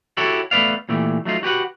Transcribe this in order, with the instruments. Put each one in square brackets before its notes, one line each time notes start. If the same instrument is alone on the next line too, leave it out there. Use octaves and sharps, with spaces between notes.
[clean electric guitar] E4 F#4 G4 A4 C#5
A3 B3 B4 D5 F5
A#2 E3 A3 G4
F#3 A3 D#4 F4
F#4 G4 B4 F#5